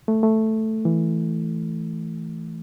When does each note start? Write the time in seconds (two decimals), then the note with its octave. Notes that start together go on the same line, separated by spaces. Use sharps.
0.08 A3
0.23 A3
0.85 E3